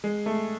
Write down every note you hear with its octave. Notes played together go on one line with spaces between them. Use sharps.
G#3
A3